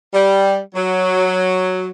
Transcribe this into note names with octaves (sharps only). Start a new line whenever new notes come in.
G3
F#3